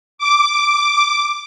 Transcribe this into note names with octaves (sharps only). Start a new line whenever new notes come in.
D6